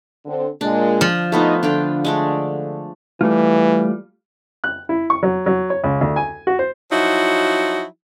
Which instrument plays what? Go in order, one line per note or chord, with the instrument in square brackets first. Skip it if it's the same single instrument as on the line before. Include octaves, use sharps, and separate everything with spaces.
[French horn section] D3 C4
[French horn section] A#2 G#3 [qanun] D4
[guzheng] F3
[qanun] A3 B3 F4 [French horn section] D#4
[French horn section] D3 [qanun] D4 F4 G5
[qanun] G#3 A3 D4
[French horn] E3 [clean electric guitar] G3 A3 F4
[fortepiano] F#6
E4
C#6
F#3
F#3
C#5
C#2
D2
G#5
F#4
C5
[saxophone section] F3 F#3 D#4 E4 F#4